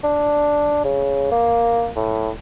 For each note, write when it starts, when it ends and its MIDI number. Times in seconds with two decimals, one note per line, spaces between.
0.04 0.81 62
0.85 1.32 49
1.32 1.89 58
1.96 2.30 45